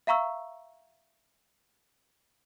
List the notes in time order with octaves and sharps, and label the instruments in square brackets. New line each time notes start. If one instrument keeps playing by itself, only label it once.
[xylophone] E5 F5 A#5 C#6 E6